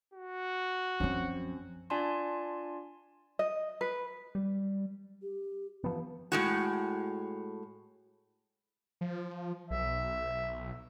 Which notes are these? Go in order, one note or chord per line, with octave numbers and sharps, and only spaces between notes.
F#4
F#2 F3 C4 C#4
D4 F4 D5 G#5 A5 C6
D#5
B4
G3
G4
E3 F3 B3 B4
A2 G#3 F#4
F3
B1 E5